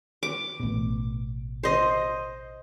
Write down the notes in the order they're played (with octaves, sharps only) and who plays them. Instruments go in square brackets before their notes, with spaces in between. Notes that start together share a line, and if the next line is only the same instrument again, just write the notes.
[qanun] D6
[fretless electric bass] A1 B2
[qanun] C5 D#5